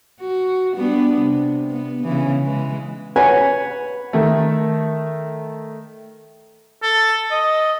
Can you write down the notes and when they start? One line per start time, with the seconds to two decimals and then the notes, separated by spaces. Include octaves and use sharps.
0.21 F#4
0.74 G3 B3 D4
1.21 C3
1.71 B3
2.04 C#3 E3
2.45 E3 G#3
3.16 B4 C#5 F#5 G#5
4.13 D#3 A3
6.83 A4
7.31 D#5